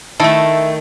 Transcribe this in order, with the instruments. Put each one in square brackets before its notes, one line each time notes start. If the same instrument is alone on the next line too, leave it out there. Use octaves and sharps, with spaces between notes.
[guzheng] D#3 A3 [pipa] E4 [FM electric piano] E5 A5